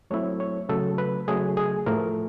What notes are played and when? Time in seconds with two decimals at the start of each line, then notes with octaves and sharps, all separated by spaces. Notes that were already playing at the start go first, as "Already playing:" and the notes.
0.11 F#3 A3 C4 E4 C#5
0.40 C#5
0.69 C#3 F#3 A3 A4
0.98 B4
1.28 C#3 F#3 A3 G#4
1.57 G#4
1.86 A2 F3 A3 A#4